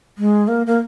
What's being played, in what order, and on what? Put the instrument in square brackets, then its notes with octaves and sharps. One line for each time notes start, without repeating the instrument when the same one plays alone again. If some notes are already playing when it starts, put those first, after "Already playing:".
[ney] G#3
A#3
A#3